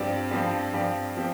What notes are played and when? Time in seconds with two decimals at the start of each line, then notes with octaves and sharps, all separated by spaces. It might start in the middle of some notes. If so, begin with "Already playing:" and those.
Already playing: G2 F3 C4 G4 D5
0.31 G2 F3 C4 G4 D5
0.73 G2 F3 C4 G4 D5
1.17 F3 C4 G4